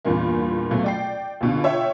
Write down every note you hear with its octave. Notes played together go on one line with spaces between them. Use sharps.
E2 G2 A#2 E3 A#3
C#2 B2 F#3 A3
D5 G5 C7
C#2 B2 D3
F4 C#5 E5 G5